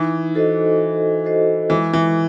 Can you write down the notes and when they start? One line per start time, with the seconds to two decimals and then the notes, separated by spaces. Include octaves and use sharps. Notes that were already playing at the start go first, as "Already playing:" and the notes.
Already playing: E3 D#4
0.35 F#4 A4 C5 D#5
0.80 D#4
1.24 F#4 A4 C5 D#5
1.70 E3 G#3
1.93 E3